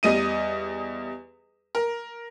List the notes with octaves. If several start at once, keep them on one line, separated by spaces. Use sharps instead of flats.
E2 G3 D#5 D#7
A#4